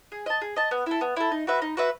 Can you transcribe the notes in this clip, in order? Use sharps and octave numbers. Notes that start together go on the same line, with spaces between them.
G#4
D#5 A5
G#4
D#5 A5
B3
E4 A4
B3
E4 A4
D#4
F#4 B4 E5
D#4
F#4 B4 E5